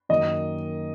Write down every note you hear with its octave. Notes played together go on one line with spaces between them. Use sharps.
F#2 D#3 A#3 D#5